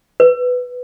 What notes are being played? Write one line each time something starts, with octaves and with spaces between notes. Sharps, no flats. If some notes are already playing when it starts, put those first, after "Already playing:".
B4